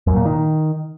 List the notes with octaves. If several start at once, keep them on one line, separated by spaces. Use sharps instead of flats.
F#2
A#2
D#3